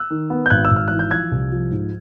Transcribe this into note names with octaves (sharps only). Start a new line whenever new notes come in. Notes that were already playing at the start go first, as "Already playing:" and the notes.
Already playing: E6 F#6
D#3
B3
G6
G#1 F#6 G#6
E6
G#1
F6
E3 F#6
G6
F3 F#6 G#6
C2
F3
G#2